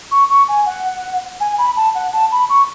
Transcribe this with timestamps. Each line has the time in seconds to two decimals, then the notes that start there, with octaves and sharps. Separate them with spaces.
0.11 C#6
0.30 C#6
0.48 G#5
0.66 F#5
1.40 G#5
1.58 B5
1.76 A5
1.95 F#5
2.13 A5
2.32 B5
2.50 C#6